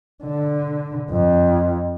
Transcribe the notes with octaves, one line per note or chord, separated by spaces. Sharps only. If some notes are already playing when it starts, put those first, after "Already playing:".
D3
F2